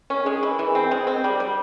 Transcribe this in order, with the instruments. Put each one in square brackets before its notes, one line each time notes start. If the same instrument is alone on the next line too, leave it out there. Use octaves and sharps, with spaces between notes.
[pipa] C#4
[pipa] G#3 [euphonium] G#4
[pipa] E3
E3
C4
G#3
C4
G3
G3